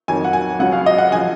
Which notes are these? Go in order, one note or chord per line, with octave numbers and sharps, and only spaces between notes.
F2 D#3 F#3 G#5
F#5
G#5
C#2 C#3 F#3 F#5
F5
D#5
F#5
G#5
C#3 F3